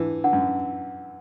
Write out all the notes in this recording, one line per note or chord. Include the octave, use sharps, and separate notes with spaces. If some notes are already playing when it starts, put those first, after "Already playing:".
Already playing: D3 E3 B4
D3 F#5
F#2